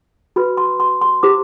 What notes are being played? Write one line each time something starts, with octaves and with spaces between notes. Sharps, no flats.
F#4 B4 B5
C6
C6
C6
E4 G4 C5 D6